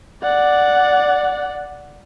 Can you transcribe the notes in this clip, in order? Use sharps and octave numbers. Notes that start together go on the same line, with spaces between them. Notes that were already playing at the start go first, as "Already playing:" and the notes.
D5 F#5